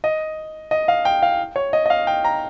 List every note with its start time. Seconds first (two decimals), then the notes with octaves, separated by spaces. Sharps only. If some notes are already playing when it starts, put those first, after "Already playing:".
0.04 D#5
0.71 D#5
0.88 F5
1.05 G5
1.23 F5
1.56 C#5
1.73 D#5
1.86 D#5
1.90 F5
2.07 G5
2.24 A#5